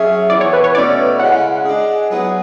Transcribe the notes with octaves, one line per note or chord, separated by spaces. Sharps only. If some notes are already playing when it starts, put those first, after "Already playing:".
Already playing: F#3 C#4 G#4 E5
E3 B3 E4 D5
C#5
B4
C#5
B2 A3 C#4 D5
C#3 G#3 C#4 E4 F#5
G#3 D4 G#4
F#3 B3 E4 G#4